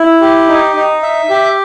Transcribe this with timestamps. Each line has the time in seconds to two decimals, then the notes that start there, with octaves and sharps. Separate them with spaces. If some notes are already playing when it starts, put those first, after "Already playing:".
Already playing: E4
0.21 G4
0.48 D#4
0.76 D#4
1.03 E5
1.30 G4